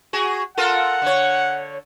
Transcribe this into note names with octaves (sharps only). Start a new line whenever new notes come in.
F#4 G#4
F4 A4 A#4 F#5
D3 C#5